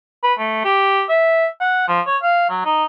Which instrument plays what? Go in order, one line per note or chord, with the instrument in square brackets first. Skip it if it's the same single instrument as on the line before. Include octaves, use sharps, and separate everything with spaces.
[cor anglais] B4
A3
G4
E5
F#5
F3
C#5
F5
F#3
D#4